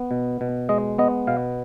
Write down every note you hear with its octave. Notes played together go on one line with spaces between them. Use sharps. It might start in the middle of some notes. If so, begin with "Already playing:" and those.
Already playing: B3
B2
B2
G#3 D#5
B3 D#5
B2 F5